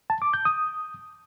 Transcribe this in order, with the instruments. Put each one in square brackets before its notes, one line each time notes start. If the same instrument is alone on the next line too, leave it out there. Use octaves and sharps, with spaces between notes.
[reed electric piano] A5
D6
G6
D#6